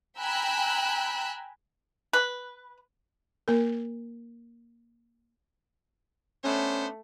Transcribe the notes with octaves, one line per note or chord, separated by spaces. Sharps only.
G5 G#5 A#5 B5 E6 F#6
B4
A#3 A#4
A3 B3 C#4 D4 C5